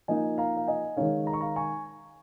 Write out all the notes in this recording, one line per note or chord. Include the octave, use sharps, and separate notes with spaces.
F3 A#3 D#4 D#5 G#5
F5 A#5
F5
D#5 G#5
D#3 G#3 D#4 C#5 F5
A#5
C#6
F5 A#5
G#5 C#6